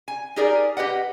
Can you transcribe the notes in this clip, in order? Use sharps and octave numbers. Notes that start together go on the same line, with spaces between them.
G#5
D#4 G4 G#4 A#4 D5
G4 B4 D#5 F#5